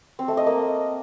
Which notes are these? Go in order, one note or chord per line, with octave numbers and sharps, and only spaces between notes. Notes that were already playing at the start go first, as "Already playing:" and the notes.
C4
A3
D#5
A#3